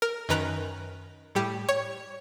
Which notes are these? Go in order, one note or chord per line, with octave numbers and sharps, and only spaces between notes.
A#4
F#2 D#3 B4 A#5 F#6
A2 G3 G4
C#5